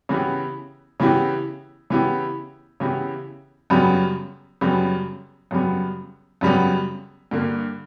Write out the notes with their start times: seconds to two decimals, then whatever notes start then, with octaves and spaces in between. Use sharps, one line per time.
0.09 C#3 E3 B3 E4 G4
1.00 C#3 E3 B3 E4 G4
1.90 C#3 E3 B3 E4 G4
2.80 C#3 E3 B3 E4 G4
3.70 F#2 C#3 G3 B3
4.61 F#2 C#3 G3 B3
5.51 F#2 C#3 G3 B3
6.41 F#2 C#3 G3 B3
7.31 G2 D3 A#3